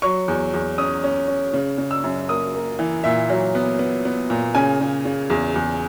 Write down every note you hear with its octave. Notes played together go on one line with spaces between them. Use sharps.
F#3 C#6
E2
E2
C#4 D#6
C#4
C#4
C#3
C#3
E6
F#2
A#3 D#6
A#3
E3
A#2 E5
F#3
B3
B3
B3
A#2
C#3 G#5
C#3
C#3
E2
E2